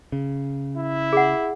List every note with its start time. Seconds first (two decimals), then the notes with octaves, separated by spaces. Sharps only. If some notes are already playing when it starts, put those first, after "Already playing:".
0.12 C#3
0.77 E4
1.13 G#4 F#5